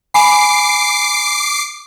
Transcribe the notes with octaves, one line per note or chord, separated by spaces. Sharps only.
G#5 B5 D6 C7